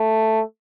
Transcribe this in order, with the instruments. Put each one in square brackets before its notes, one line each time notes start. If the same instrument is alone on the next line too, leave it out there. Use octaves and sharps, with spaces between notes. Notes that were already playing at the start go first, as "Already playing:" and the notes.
Already playing: [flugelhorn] A3